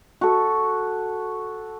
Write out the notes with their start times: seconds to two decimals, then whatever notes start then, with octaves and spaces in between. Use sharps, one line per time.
0.21 F#4 A4